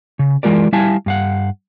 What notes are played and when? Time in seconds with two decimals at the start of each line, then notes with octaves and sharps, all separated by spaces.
0.19 C#3
0.43 E3 G#3 F4 A#4 D5
0.73 G3 E4 E5 F5 G#5 A5
1.06 G2 F5 F#5